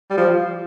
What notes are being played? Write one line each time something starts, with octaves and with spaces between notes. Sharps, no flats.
G3
F3